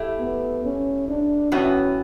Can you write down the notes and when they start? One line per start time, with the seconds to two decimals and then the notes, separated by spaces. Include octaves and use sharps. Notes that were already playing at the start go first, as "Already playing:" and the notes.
Already playing: A3 E4 G4
0.19 B3
0.64 C#4
1.08 D4
1.52 A2 E3 B3 C#4 F#4